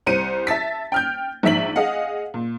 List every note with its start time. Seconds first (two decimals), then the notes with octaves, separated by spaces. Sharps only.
0.06 C2 C5 C#7 D#7
0.47 E5 A5 A6 B6
0.92 G5 F6 G6
1.43 A#1 G#2 E5 B6 F#7
1.76 G#4 D#5 F5 F#5
2.34 A#2